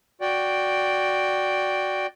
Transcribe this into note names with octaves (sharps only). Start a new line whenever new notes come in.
F#4 D5 G5